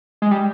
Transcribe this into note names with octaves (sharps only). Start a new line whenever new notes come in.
G#3
G3